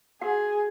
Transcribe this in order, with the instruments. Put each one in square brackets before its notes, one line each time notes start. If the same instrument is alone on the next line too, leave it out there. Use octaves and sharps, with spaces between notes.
[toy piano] F#4 F#5 [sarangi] G#4